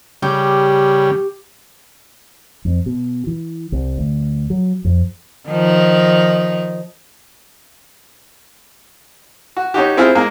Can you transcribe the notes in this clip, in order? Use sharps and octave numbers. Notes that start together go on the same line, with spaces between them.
C#3 G3 G4
F2
B2
E3
C2
D2
F#3
F2
D#3 F3 D#4
F#4
C#4 D#4 F#4 G4
C4 E4 F4 G#4 F6
G#3 A#3